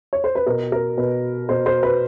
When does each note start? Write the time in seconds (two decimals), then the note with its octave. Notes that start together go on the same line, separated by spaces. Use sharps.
0.13 C#5
0.24 C5
0.35 B4
0.47 B2 A#4
0.72 A#4
0.97 B2 B4
1.49 B2 C5
1.66 C5
1.83 B4